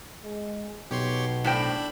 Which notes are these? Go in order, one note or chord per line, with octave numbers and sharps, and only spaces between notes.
G#3
B1 B2 G4 C#5 C6
A2 D4 C5 G5 B5